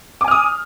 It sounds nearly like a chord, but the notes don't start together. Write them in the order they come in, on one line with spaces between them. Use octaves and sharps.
D6 G#5 F6 D#6